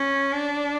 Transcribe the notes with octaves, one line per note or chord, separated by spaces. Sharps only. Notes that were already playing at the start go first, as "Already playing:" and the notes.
Already playing: C#4
D4